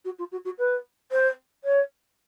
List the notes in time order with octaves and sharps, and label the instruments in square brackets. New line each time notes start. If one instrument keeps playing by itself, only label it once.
[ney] F#4
F4
F#4
F#4
B4
C5
C#5